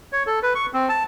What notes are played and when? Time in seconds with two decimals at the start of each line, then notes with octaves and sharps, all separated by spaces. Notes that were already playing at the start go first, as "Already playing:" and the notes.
0.12 C#5
0.27 A4
0.43 B4
0.55 C#6
0.73 C4
0.89 A5